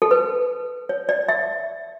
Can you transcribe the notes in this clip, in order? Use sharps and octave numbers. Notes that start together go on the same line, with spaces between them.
A4
B4
C#5
D5
E5